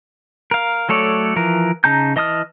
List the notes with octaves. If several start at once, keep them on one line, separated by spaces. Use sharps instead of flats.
A#4 F5
F#3 A3 A4 C#5 D5
E3 F3 A#4
C#3 D#4 A5 A#5 G6
E3 D#5 A5 D#6 F6